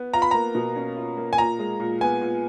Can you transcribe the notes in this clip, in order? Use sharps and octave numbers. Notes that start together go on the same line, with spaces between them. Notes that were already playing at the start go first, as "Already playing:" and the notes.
Already playing: B3
F4 A#5
B5
A#3 A#5
B2
C#4
F4
A#3
G#5
A#2 A#5
G#3
A#2
B3 G#5
A#2